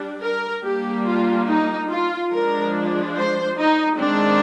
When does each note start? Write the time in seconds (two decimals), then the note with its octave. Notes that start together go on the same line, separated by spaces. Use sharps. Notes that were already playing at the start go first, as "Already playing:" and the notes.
Already playing: G3 D4
0.22 A#4
0.63 G3 A#3 D4 G4
1.05 F4
1.47 D#4
1.89 F4
2.31 F3 G#3 D4 A#4
3.16 C5
3.58 D#4
3.99 D#3 G#3 C4 D4